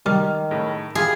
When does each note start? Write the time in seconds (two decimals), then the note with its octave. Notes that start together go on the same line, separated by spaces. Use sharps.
0.06 D#3 G3 F6
0.51 A2 C#3
0.95 E4 F4 G4 G#4